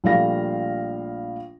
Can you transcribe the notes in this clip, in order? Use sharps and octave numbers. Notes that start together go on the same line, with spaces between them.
A#1 G3 A3 F5 A#6